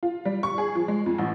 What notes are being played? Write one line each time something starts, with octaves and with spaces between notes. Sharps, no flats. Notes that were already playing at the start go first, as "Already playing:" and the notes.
F4
G3
C#6
G#4
F3
G#3
F2
A1